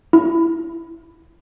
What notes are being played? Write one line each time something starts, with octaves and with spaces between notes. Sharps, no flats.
E4